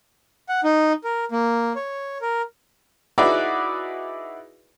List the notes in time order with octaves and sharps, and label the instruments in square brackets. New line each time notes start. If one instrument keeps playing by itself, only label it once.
[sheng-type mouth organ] F#5
D#4
A#4
A#3
C#5
A#4
[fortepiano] D#4 E4 F#4 G#4 B4 D5